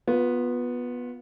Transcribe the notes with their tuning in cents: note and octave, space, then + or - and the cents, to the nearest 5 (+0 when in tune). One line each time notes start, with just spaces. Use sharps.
B3 -10 F4 +20